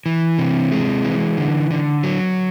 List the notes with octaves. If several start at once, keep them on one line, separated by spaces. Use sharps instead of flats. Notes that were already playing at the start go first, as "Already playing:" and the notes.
E3
C3
G#3
E3
D3
D3
F#3